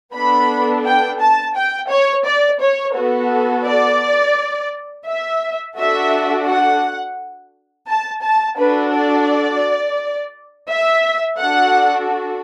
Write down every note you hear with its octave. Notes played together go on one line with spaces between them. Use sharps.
B3 D4 A4 B5
G5
A5
G5
C#5
D5
C#5
B3 F#4 A4
D5
E5
D4 F#4 A4 E5
F#5
A5
A5
D4 F#4 A4 B4
D5
E5
D4 F#4 A4 F#5